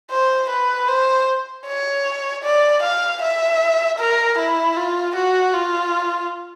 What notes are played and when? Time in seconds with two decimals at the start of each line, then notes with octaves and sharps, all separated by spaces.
0.11 C5
0.50 B4
0.88 C5
1.67 C#5
2.44 D5
2.83 F5
3.22 E5
3.99 A#4
4.38 E4
4.76 F4
5.16 F#4
5.54 F4